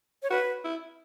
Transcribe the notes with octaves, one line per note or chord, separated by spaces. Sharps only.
C#5
F#4 B4
E4